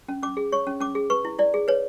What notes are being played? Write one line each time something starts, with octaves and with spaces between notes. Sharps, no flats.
C#4
C#4 D6
G#4
C#5 C#6
C#4
C#4 D6
G#4
B4 C#6
E4
E4 D5
G#4
B4 C#5